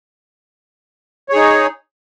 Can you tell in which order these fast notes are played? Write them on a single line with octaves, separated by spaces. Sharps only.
C#5 G#4 D#4